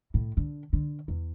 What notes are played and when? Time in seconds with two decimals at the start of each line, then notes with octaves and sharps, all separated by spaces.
0.14 A2
0.37 D3
0.73 D3
1.08 E2